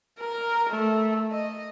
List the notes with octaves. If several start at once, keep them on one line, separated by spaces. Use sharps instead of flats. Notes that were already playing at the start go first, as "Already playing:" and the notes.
A#4
A3
D#5